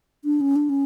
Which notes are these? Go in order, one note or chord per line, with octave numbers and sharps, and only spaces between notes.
D4
C#4
D4
C#4